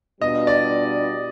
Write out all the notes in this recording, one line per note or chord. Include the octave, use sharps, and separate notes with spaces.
B2 G3 B3 D4 F4 D#5
D5